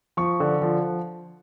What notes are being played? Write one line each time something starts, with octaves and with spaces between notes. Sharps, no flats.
F3 C#6
D3
F3